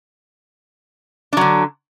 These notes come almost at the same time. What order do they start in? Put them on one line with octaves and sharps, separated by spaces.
D4 F#3 D3